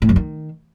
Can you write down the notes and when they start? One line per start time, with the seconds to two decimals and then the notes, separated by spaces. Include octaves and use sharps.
0.02 A2
0.09 F#2
0.16 D#3